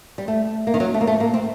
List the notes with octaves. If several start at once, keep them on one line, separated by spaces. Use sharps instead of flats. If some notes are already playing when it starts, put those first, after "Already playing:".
G3
A3
A#3
D#3
F#3
A3
A#3
A3
A#3
C4